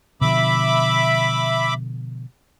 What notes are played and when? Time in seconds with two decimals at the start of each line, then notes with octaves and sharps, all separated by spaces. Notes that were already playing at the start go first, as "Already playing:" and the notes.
0.21 B2 D3 F3 E5 B5 D6